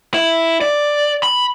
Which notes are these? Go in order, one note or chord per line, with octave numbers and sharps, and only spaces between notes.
E4
D5
B5